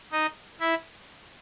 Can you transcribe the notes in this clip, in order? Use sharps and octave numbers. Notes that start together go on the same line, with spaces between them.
D#4 D#5
E4 E5